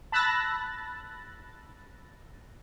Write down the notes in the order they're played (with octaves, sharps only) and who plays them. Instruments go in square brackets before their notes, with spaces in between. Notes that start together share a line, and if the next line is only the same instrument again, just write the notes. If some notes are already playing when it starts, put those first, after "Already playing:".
[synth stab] A5 B5 E6 F#6 A6 A#6